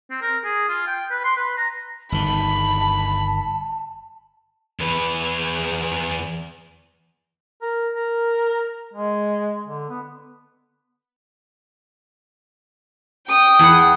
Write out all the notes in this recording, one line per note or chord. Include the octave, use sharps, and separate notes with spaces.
C4
A#4
G#4
F4
G5
B4
C6
B4
A#5
G1 D#3 A5 B5
E2 B4
A#4
A#4
G#3
D3
B3
G5 D#6
E2 F#5